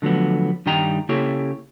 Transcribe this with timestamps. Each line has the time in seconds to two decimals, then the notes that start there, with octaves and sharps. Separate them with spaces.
0.02 D3 F3 F#3 A3 B3
0.66 G2 D#3 G3 D#4 G5 A#5
1.09 C#3 A#3 E4 G4 A4 C#5